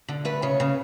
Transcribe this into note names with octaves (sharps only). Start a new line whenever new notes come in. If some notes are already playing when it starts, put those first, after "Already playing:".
D3
A3 B4
C#3 C#5
C#3